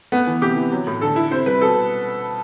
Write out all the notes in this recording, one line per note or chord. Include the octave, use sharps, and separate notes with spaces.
A3 B3
E3
C3 G4
E3
F#3
A2
D3 A4
E4
C3 C5
G3 B4
B2 A4